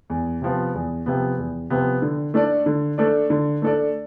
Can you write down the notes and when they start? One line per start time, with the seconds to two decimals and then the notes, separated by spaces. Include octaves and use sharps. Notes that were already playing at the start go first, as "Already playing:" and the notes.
0.10 E2
0.42 C3 F3 B3
0.74 E2
1.06 C3 F3 B3
1.38 E2
1.70 C3 F3 B3
2.02 D3
2.34 A3 D4 A4 D5
2.66 D3
2.98 A3 D4 A4 D5
3.30 D3
3.62 A3 D4 A4 D5